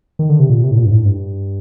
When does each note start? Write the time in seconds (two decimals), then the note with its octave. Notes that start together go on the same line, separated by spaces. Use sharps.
0.19 D#3
0.29 D3
0.40 C3
0.50 A#2
0.63 C3
0.71 A2
0.77 A#2
0.85 G2
0.91 A2
1.05 G2